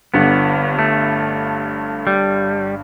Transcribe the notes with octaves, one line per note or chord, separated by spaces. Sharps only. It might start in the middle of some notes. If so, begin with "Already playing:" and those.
G1 G2 D3 B3
A3
G3